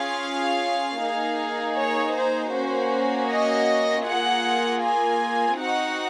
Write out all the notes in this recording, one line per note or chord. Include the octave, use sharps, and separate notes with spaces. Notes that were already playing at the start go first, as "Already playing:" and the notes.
Already playing: C#4 F4 G#4 F5
A#3 D#4 G#4
C#5
C5
A#3 C#4 F#4 C5
D#5
A#3 F4 G#4 F#5
G#5
C4 D#4 F#4 F#5